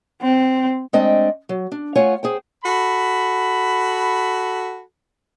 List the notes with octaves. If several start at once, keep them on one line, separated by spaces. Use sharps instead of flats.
C4
G#3 A3 C4 D4 D#5 G5
F#3
D4
A3 F4 C#5 F#5 G#5
G#4 C5 G5
F#4 A4 B5